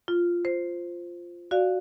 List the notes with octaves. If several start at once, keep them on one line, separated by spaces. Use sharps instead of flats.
F4
C5
F#4 D5 F5